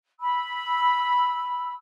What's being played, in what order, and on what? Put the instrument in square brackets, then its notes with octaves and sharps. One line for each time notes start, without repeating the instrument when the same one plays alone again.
[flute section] B5 E6